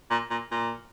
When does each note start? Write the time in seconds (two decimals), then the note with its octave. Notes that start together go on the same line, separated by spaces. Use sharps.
0.10 A#2
0.30 A#2
0.51 A#2